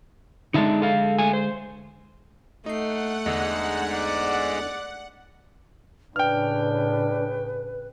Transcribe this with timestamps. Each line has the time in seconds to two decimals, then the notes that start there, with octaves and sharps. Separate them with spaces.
0.54 D3 G#3 D#4 E5 A5
0.82 A4 F5
1.19 A3 G#5
1.33 C5
2.66 A3 D#4 F#5 C7
3.26 E2 D3 G#3 D#4
3.94 D5
6.16 A2 C#3 D4 B4 G5 F6